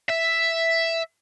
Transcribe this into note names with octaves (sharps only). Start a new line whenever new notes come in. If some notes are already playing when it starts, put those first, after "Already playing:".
E5